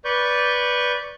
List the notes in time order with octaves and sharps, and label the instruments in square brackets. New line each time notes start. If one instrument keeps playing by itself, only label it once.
[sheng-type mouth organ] B4 D5 C#6 G6